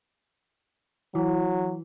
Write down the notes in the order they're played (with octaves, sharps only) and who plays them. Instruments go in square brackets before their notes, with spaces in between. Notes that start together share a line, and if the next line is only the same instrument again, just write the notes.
[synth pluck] E3 [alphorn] F#3